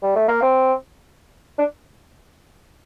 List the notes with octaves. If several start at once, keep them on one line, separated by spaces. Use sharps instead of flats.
G3
A3
A#3
C4
D4